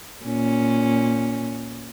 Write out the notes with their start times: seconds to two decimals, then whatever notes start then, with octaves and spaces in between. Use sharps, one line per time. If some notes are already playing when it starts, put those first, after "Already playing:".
0.24 A#2 C#4